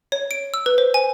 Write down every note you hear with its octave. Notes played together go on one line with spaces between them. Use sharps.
C#5
D7
E6
B4
C5
G#5